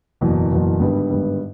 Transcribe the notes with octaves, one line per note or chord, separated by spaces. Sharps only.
F#1 E2 B2
F#1 E2 B2
G#1 G2 D3 G3 B3
G#1 G2 D3 G3 B3